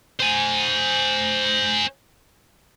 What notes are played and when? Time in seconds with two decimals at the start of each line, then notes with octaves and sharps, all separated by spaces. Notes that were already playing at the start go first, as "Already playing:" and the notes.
0.20 C5 G#5